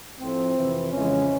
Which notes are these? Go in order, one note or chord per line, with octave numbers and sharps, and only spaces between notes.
A2 F3 A3 C4
F2 C3 E3
F2 C#3 E3 G#3 C#4